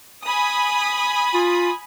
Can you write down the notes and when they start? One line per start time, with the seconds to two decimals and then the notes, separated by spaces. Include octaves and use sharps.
0.24 G#5 B5 D#6
1.34 F4